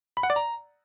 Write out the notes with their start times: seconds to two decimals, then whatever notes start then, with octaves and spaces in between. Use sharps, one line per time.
0.17 B5
0.23 F#5
0.30 D5
0.36 A#5